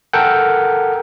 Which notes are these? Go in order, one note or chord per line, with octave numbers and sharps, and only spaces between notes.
A4 A#4 F#5 G5